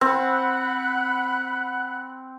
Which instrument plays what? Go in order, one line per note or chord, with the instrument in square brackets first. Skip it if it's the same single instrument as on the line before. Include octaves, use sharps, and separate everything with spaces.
[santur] C4 [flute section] F#5 B5 F#6